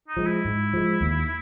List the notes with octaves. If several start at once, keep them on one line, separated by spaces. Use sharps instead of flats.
D#4
F3 G#3
E4
G#2
F3 G#3
D#2